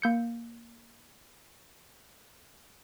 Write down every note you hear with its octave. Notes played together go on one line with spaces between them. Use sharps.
A#3 G6 C#7